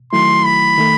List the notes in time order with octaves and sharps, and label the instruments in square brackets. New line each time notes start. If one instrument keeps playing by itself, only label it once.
[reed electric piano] D#3 F#3 A3 E4 [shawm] C6
[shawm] B5
[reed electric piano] D#3 A3